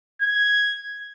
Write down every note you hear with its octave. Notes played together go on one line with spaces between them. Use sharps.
G#6